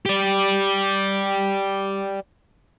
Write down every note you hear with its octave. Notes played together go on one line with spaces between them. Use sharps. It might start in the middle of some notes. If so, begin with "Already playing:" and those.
G4 D5